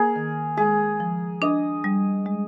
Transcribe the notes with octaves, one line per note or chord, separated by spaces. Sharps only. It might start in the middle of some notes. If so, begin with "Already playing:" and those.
Already playing: A#3 G#4 A#4
D#3
G#3 G#4
F3
D4 D#5
G3
G#3